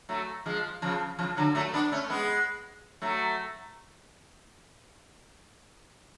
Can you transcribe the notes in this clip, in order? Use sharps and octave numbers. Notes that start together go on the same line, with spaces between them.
F#3 A3
F3 G#3
C#3 F3
C#3 F3
D3 F#3
F#3 A3
B3 D4
A3 C#4
G#3 B3
F#3 A3